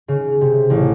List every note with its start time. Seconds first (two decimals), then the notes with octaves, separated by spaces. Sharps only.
0.08 C#3
0.41 C3
0.70 A1